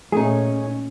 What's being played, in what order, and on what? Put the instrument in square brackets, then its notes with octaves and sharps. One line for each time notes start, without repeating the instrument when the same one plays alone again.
[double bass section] A#2 C#4 [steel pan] A3 [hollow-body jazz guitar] D#4 G#4